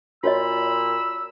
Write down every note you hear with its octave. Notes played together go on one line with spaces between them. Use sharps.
A#2 F#4 C#5 D#5 B5 E6